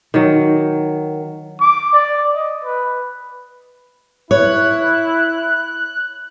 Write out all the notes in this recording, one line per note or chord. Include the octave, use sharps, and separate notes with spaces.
D#3 F#3
D6
D5
D#5
B4
E4 C#5 F#6